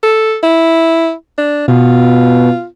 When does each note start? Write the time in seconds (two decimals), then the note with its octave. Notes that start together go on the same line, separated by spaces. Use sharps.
0.03 A4
0.43 E4
1.38 D4
1.68 B2 F4